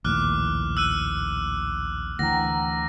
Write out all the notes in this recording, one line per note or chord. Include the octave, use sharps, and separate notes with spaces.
A#1 D#2 A2 D6 F6 F#6
E6 F#6 D#7
D2 E3 F#5 G5 A#5 A#6